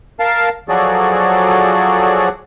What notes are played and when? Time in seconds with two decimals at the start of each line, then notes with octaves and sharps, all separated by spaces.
0.20 A#4 F5 A5
0.69 F3 F#3 F#4 G#4 A4 D5